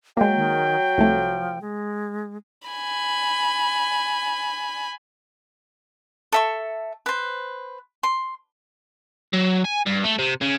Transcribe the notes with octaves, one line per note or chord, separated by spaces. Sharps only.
F#3 G#3 A#3 G5
D#3
C2 F3 A3
G#3
G#5 B5
A4 E5 C#6
B4 C5
C6
F#3
G#5
G2
A3
C3
C#3